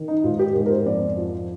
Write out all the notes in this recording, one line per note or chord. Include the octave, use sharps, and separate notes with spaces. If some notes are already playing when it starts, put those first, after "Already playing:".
Already playing: D#3
D#4
G#2 F4
G4
G#2 A#4
A#4
C5
F2 D5
F3